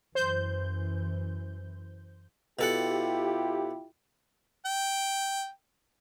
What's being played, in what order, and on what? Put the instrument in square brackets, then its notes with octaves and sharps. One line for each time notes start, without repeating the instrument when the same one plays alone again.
[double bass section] F#2 E3 [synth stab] C5 G6
[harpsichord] B2 A4 F#5 [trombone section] E4 F4 G4
[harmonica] G5